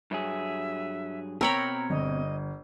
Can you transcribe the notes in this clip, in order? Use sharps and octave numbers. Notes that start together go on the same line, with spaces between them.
G2 F#3 G#4 E5
B2 C4 A#4 C#5 G5 A#5 B5 E6
G1 D#5